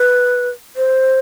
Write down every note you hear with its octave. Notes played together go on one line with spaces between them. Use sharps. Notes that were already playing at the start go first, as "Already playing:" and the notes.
Already playing: B4
C5